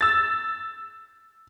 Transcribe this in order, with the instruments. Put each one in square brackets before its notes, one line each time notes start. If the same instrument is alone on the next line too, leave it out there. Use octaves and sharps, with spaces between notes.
[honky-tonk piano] E6 A6